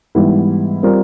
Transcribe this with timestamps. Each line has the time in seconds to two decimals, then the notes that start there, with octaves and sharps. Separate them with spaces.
0.15 G#2 E3 G3 B3 E4
0.83 G3 C4 F4 A#4 D5